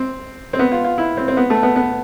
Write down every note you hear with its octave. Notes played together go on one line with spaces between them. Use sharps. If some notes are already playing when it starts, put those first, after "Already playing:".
Already playing: C4
C4
B3
F4
F4
E4
C4
C4
B3
A3
B3
B3